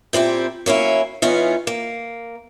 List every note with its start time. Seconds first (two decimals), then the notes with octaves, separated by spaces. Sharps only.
0.13 A#2 C4 E4 G4
0.66 F#3 A#3 C#4 E4
1.22 E3 B3 C#4 D#4 F4
1.67 A#3